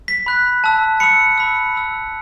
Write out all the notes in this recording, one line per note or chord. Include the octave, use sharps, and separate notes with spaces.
B6
B5 F#6
A5 E6
B5 E6 C#7
B5 E6
B5 E6